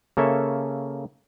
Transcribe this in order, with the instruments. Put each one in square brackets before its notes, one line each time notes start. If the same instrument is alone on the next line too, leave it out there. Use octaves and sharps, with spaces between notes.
[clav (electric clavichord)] C#3 A#3 A4 C#5 E5